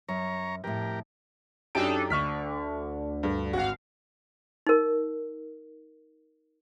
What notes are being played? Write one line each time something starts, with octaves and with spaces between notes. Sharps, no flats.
F#2 C#5 A#5
F2 A2 G4 A#4
F#2 D4 D#4 G4 A4 D7
D2 D3 C#6 F6 B6
G2
G#1 F#4 F5 F#5
D#4 A#4